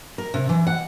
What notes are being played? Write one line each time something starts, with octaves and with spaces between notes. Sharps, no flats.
A#4
C3
E3
F#5